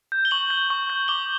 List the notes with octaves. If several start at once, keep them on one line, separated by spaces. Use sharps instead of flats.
G6
G7
C#6 F#7
G6
C#6
G6
D6 G7